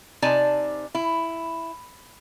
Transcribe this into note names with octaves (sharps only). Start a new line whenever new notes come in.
C3 D#4 D5 G#5 A5
E4